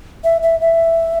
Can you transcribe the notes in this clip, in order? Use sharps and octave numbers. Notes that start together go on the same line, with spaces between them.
E5
E5
E5